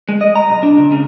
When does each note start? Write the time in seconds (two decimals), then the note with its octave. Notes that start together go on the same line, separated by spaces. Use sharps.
0.09 G#3
0.21 D#5
0.36 A#5
0.50 B1
0.63 D4
0.77 C#2
0.92 C#3